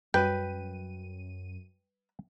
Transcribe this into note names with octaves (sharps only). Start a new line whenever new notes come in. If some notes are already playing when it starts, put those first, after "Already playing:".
F#2 G3 F#4 B4 G5 D#7